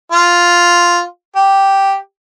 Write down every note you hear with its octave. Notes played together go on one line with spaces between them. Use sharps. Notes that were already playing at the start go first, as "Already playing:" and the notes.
F4
G4